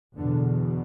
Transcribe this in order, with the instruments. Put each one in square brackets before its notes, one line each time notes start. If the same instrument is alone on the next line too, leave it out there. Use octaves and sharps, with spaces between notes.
[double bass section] E2 B2 D3